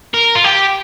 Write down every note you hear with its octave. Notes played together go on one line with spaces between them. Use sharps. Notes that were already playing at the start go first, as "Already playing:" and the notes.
A#4
F4
G4